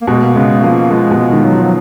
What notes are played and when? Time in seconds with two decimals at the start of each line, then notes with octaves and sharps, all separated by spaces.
0.02 A#3
0.07 B2 G#3
0.24 A#3
0.35 C#3 G#3
0.63 F3 A#3
0.90 F3 G#3
1.11 B2
1.18 G#3
1.32 D#3
1.46 F#3
1.53 F3
1.63 F#3